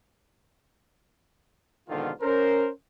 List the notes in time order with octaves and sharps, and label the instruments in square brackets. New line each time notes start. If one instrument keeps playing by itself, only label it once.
[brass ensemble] F2 G#2 B2 D3 D#3 F4
C#4 A#4 C5